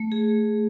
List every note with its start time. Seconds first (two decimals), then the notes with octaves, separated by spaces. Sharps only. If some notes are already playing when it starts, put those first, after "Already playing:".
Already playing: A3
0.12 G#4